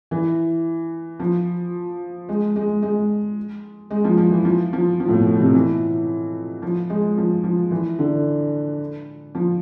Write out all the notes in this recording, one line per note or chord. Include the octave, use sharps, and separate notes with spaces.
E3
F3
G#3
G#3
G#3
G#3
F3
F3
E3
F3
F3
F3
A2
B2
B2
C3
E3
F3
G#3
F3
F3
E3
D3
F3